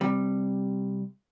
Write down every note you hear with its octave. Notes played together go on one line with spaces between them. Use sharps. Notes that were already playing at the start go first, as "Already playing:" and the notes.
C3 G3